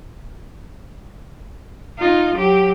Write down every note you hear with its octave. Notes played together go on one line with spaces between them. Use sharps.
D#4 F4
F#3 G4